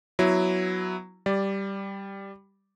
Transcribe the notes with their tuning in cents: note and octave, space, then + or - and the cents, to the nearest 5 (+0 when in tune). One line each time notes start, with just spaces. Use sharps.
F#3 +0 B3 +0 E4 +0
G3 +0 D5 +0